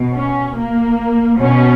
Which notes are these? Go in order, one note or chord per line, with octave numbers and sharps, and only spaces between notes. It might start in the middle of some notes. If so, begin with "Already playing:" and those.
Already playing: B2
C#4
A#3
B2 C#4